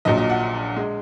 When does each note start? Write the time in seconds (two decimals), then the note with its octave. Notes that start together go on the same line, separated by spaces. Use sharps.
0.05 A#1 A#2 F#3 D#5
0.18 D#5
0.30 F#5
0.77 G#3